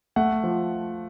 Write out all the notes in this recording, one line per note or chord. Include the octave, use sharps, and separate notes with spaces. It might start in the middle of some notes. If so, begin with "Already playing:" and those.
A3 F#5
F3